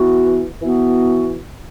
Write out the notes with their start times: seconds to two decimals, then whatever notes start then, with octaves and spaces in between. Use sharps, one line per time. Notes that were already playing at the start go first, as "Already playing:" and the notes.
Already playing: E3 B3 F#4
0.62 E3 B3 F#4